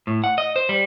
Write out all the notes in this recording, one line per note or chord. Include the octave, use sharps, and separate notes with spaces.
A2
F#5
D#5
C5
G3